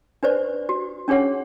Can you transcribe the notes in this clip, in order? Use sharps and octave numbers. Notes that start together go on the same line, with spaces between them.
D4 B4 C5 D5
F#4
C#4 D4 G#4 C#5 F#5